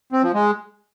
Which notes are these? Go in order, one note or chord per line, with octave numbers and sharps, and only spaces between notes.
C4
F3
G#3